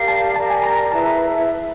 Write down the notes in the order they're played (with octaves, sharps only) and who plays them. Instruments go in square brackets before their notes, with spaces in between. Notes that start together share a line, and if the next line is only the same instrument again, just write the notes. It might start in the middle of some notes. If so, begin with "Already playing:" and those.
Already playing: [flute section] G4 A#4 D5 F5
[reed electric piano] A5
[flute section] G4 A#4 D5 [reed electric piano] A5
[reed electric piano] G#5
A#5
[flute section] E4 G#4 B4 E5 [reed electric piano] A5
[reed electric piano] A#5